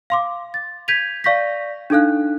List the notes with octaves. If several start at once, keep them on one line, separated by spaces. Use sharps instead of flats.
F5 C6 D6
A6
G6 G#6 B6 D#7 F7
D5 F5 C#6 G6 A#6 B6
D4 D#4 A4 F5 F#6